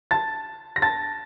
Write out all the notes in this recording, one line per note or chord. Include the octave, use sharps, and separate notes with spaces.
A5 A6
A#6
A5 A6